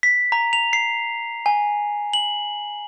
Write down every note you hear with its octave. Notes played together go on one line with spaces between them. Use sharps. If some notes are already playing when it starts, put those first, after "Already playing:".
B6
A#5
F7
C7
G#5
F#7